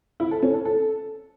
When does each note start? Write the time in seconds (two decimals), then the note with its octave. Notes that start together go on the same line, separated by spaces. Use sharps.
0.20 E4
0.31 A4
0.43 C#4
0.54 A4
0.65 A4